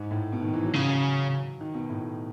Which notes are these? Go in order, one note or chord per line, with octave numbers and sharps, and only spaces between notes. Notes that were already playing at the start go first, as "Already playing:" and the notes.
Already playing: G#2
A2
B2
D#3
E3
F#3
C#3
D#3
B2
A2